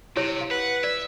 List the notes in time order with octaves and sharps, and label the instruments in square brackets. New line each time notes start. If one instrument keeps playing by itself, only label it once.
[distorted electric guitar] C3 [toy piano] E4 G4 C#5
[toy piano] C#5 F5
[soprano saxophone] B4 [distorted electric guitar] F#5
[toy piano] D5 [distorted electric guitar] E5